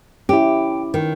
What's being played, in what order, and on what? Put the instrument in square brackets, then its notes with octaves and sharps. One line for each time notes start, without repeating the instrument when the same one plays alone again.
[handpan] C#4 E4 [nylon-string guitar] G4
[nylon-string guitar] D#3